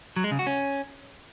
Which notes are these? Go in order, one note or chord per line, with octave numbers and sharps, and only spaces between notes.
F#3
G#3
C#3
F#4
C#4